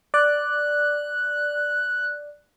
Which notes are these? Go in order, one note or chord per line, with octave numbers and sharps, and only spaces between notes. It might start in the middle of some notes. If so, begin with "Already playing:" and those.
D5 F#6